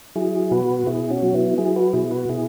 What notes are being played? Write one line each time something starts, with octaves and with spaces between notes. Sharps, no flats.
F#3 E4 G#4
B2 F#4 B4
B2 E4 G#4
C#4 F#4
F#3
B3 E4
F#3 E4 G#4
F#4 B4
B2 E4 G#4
F#4 B4
B2 E4 G#4